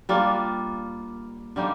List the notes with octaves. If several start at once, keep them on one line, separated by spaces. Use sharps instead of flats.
G3 A#3 D4 F4
D3 G3 A#3 D#4